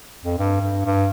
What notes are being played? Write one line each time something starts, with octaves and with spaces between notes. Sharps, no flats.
F2
G2
G2
G2